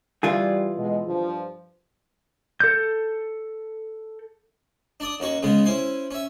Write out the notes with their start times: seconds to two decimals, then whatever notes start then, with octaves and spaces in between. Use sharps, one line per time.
0.23 E3 G3 F4 G#4
0.77 B2 G#3
1.06 G2 F3
2.60 A4 G6
5.00 D4 D5 D#6
5.20 D#2 C#4 F#4 C#6
5.43 C#3 G#3 B3 C#4
5.64 C#4 E4 C5 G#5
6.11 C#4 E5